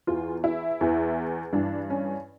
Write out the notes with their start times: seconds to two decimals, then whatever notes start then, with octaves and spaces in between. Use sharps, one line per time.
0.07 E2 E3 F4
0.44 E4
0.81 E2 E3
1.53 G2 E3 D4
1.90 C#4